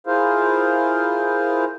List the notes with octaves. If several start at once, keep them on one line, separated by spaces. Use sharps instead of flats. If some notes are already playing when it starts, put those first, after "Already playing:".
E4 F4 G#4 A#4 C5 F5